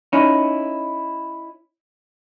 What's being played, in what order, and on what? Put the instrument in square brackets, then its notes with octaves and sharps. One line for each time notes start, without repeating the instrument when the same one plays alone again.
[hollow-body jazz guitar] C#4 D#4 E4